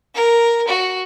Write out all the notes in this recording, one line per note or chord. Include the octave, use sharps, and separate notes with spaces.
A#4
F#4